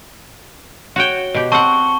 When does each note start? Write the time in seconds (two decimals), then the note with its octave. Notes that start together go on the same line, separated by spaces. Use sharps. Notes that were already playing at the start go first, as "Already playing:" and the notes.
0.96 F#4 C#5 G5
1.34 B2 G4
1.52 C4 F#5 A5 C#6 G7